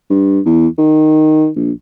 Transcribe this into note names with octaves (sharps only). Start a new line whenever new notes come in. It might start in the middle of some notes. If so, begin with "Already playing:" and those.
G2
E2
D#3
A#1